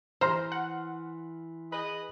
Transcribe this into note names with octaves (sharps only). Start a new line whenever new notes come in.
E3 C5 A#5 C6 F6
F#5
G#4 B4 D#5